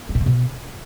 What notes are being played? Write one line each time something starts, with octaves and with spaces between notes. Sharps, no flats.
G#3
A2
D3
B2